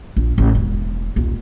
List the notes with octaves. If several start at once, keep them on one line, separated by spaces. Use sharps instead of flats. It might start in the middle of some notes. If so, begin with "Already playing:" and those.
A#1
A1
E1
D#1 B1